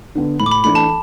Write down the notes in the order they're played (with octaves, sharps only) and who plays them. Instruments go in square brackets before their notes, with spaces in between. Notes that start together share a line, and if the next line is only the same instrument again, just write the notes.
[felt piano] D3 B3
[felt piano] A2 [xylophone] B5
[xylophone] D6
B5
[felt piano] E3 A3 D4 A4 [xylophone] B5
[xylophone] A5